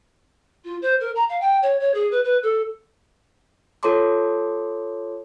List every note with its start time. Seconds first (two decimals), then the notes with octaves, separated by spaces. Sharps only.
0.64 F4
0.82 C5
1.00 A#4
1.15 A#5
1.29 F5
1.41 G5
1.62 C#5
1.80 C#5
1.94 G#4
2.11 B4
2.24 B4
2.43 A4
3.83 F4 A4 C#5 A5 C6 D6